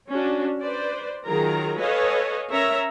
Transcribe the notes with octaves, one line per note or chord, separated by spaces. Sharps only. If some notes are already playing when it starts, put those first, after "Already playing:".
C#4 D4 F#4
B4 C5 D5
D#3 F#3 F4 G#4 A#4 A#5
A4 B4 C#5 D#5 F5 G#5
C#4 A#4 C#5 E5 A#5